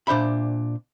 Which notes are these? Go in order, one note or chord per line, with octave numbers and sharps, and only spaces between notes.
A#2 D4 C5 E5 B5